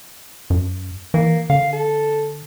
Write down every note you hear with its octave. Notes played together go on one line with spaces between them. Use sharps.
F#2
E3 A#3
D3 F5
A4